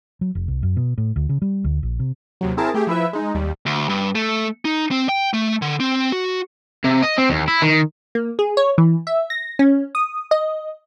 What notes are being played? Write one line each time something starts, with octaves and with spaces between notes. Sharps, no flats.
F#3
F1
C2
F#2
B2
A2
D2
C#3
G3
D2
A#1
C3
D#2 C3 F#3
C4 E4 G#4 A#4 A5
A3 G4 G#4
F3 E4 B4 E5
G#3 D#4
D#2 G3
D2
G2
A3
D#4
C4
G5
A3
D3
C4
F#4
C3
D#5
C4
D#2
E4
D#3
A#3
G#4
C#5
E3
E5
A#6
C#4
D#6
D#5